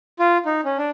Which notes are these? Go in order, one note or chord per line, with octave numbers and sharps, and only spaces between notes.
F4
D#4
C#4
D4